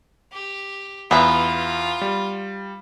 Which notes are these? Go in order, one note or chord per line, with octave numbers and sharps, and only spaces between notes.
G4
E2 B3 F4 E5
G3